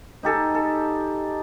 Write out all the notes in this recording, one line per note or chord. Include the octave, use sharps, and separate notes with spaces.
D#4 G4 A4 G#5
A4